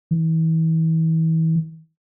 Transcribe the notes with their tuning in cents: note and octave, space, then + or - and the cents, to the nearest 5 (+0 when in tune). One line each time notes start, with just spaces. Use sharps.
E3 -35